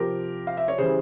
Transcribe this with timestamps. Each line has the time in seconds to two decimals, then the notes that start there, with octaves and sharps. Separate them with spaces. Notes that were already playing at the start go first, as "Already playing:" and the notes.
Already playing: C3 F3 G4 A#4
0.47 F5
0.57 E5
0.68 C#5
0.78 C#3 E3 G3 G#4 C5